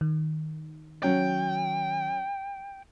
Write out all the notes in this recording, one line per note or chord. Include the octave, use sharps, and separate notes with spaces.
D#3
F#3 C#4 G5